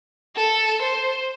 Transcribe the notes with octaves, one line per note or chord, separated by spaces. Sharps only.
A4
C5